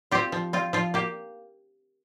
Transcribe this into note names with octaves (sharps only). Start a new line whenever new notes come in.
C4 F4 G4
F3
C4 F4
F3 F4
A#3 G4